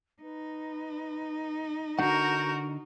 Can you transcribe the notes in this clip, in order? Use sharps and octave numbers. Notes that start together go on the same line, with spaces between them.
D#4 B4
D3 D4 F#4 A#4 F#5 G6